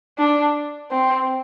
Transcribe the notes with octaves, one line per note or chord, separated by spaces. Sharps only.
D4
C4